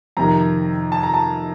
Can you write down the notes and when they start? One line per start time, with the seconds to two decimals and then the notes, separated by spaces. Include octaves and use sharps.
0.17 F2 C3 D#3 A#5
0.92 A5
1.03 A#5
1.14 A5